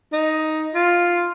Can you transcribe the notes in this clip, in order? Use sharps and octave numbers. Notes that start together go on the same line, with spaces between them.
D#4
F4